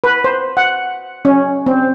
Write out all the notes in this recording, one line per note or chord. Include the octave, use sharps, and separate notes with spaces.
B4
C5
F#5
C#4
C4